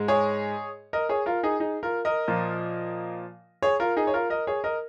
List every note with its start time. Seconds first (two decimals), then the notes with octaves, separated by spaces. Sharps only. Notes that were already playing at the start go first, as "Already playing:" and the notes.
Already playing: G#2 G#3
0.08 G#4 C#5
0.93 A#4 D#5
1.09 G#4 C#5
1.26 F4 A#4
1.43 D#4 G#4
1.60 D#4 G#4
1.83 F4 A#4
2.05 A#4 D#5
2.28 A#2 F3 A#3
3.62 G#4 C#5
3.80 F4 A#4
3.97 D#4 G#4
4.07 C#5
4.14 F4 A#4
4.30 A#4 D#5
4.47 G#4 C#5
4.64 A#4 D#5